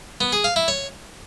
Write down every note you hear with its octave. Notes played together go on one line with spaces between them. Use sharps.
B3
G#4
F5
E4
C#5